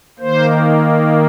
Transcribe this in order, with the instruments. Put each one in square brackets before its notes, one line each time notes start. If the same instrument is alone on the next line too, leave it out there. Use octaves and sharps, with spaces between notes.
[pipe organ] D#3 A#3 C5